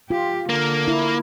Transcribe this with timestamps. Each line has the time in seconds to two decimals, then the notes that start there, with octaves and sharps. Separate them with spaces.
0.10 F4 G4
0.49 D3 A#3
0.88 E4